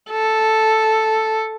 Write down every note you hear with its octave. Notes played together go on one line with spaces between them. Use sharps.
A4